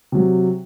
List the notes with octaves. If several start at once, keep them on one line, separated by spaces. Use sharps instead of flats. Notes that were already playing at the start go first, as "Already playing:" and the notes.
C3 F#3